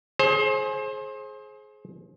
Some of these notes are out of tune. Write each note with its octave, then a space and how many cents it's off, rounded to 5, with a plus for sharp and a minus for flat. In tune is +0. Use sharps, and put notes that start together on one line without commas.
G#4 +30 C5 +30